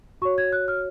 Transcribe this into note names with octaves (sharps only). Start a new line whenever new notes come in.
F#4 C#5 C#6
G#6
F#6
F6